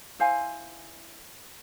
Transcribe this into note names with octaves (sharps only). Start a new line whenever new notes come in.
E4 C5 F5 G#5